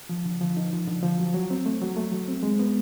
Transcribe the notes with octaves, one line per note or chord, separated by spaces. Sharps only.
F3
D3
F3
D#4
F3
D3
F3
F#3
F#3
C4
A3
F#3
A3
F#3
C4
G#3
B3